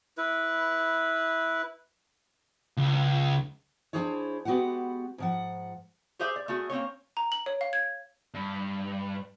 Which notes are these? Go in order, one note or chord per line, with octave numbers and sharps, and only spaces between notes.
E4 B4
C#2
D4 E4 F4 G#4 C5 C#5
G#3 B3 F#4 G4 B4 F#5
G#2 F3 F#5
G4 G#4 C5 E5
D5
A3 B3 F#4 G#4
A#3 C4 C#4 C#5
A#5
F#7
C#5
F5
G#6
G2